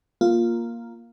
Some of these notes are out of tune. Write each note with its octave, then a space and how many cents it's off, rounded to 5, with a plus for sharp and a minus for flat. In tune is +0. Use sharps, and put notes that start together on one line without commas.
A#3 +5 F4 +0